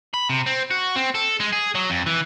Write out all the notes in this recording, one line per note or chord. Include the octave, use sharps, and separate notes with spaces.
B5
C3
C4
F#4
C4
A4
G#3
G#4
F#3
F2
E3